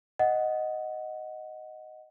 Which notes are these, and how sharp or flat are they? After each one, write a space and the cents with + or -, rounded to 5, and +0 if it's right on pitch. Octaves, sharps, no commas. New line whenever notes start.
D#5 +0 F#5 +0